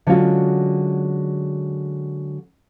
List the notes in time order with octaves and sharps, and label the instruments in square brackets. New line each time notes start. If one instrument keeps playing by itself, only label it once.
[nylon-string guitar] D3 F#3 G#3 C#4 F4 F#4